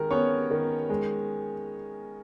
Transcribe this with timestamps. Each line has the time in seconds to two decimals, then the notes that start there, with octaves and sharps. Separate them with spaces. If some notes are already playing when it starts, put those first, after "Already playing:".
Already playing: D#3 G#3 A#4
0.11 B3 C#4 C#5
0.51 D#3
0.90 G#3